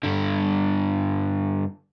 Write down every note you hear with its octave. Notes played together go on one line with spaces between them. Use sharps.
G2 D3